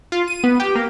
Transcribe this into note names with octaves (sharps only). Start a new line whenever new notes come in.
F4
D#7
B3
G4
A#3